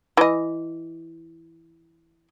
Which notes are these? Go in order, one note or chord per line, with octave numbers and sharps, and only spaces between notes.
E3 D#5